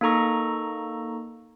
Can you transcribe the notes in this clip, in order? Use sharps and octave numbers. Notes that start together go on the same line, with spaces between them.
A#3 D#4 A4 A#5 C#6 A#6